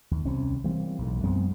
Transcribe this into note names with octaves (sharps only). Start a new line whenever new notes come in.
D#2
C2 C3 C4 C#4
E3 G3 A#3 C4
B1 A2
F#2 G#3 B3 C4